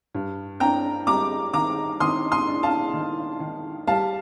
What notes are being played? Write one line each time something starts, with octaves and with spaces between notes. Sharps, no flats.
G2
D4 G5 A#5
G3 A#5 D6
D#3 A#5 D6
D#3 C6 D#6
C6 D#6
D4
F5 A5
D#3
D#3
G3 F5 A5